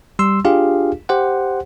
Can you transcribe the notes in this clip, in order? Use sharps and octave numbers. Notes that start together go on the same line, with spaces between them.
G3 C6 E6
D4 F4 G4 G#4 F5
G4 C5 F#5